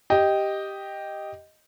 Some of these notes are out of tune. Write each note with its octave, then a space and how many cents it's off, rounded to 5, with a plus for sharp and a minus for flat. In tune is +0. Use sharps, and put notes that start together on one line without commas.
G4 +0 D#5 +0